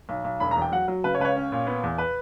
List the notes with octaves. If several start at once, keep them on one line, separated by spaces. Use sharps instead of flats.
B1
B1
E1 B5
A#5
E2
G5
F#3 F#5
F#3
C#3 B4
C#5
C#2 B4
C#5
C#4
A#2
B3
E2
B4